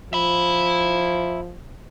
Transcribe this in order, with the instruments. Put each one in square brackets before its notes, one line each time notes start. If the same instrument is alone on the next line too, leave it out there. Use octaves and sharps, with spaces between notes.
[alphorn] F3 [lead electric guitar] E5 B5